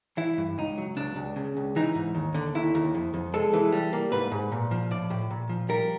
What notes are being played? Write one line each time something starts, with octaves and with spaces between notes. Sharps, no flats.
E3 E4
G2
C#2 D#4
F#3
C#2 D4
C#2
C#3
C#2
E3 D#4
G#2
D#2
D3
D#2 E4
D#2
F2
F2
G#3 A4
E3
G3
A#3
G#2 B4
G#2
A#2
F3
A2 D5
A2
A#2
F3
G3 A#4